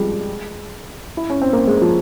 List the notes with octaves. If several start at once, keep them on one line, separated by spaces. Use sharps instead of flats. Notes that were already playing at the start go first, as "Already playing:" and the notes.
Already playing: F3 G3 G#3
E4
C#4
C4
A#3
G#3
F3